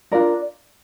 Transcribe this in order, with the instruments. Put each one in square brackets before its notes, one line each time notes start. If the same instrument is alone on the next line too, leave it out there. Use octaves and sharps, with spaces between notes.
[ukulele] D4 F4 A#4 D5